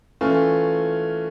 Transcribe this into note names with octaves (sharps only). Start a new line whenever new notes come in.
E3 A3 C#4 F4